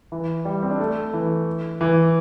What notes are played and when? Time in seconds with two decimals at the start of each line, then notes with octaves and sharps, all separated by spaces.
0.12 E3
0.45 G3
0.63 C4
0.71 D4
0.80 A3
1.13 E3
1.81 E3